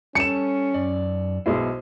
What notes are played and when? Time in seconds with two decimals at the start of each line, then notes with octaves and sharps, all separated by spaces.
0.15 G3 C#4 A4 A5 C#7 E7
0.74 F#2 D5
1.46 B1 G#3 E4 C5